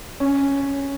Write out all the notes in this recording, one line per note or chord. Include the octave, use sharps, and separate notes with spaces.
C#4